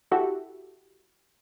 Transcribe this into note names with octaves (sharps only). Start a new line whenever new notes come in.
E4 F#4 G4 A4 E5